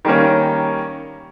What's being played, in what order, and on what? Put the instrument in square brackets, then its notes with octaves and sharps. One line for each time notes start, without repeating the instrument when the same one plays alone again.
[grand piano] D#3 G3 A#3 C#4